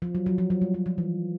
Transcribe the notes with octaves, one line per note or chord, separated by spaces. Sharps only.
F3
F#3
F#3
F3
F#3
G3
F#3
F3
E3